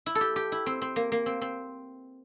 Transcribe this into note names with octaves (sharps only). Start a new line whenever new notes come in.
E4
A4
G4
G4
E4
C4
C4
A#3
A#3
C4
C4